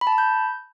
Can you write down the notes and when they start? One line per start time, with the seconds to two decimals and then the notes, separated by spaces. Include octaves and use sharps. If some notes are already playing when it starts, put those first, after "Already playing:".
0.01 B5
0.07 A5
0.13 B5
0.18 G6